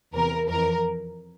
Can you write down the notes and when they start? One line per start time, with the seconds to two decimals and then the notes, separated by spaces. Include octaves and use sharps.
0.14 E2 C3 E3 A#4
0.50 F2 E3 A#4